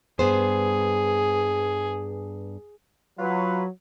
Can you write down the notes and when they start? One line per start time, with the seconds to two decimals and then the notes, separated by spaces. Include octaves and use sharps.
0.19 G2 B3 G#4 C5
3.19 F#3 F4 B4